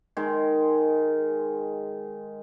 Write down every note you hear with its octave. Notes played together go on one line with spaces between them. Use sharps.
D#3 G#3